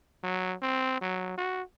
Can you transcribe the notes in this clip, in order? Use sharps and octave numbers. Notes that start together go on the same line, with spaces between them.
F#3
C4
F#3
F#4